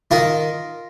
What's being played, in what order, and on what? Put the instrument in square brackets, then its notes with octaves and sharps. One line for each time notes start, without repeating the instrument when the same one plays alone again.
[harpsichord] D#3 F4 A#4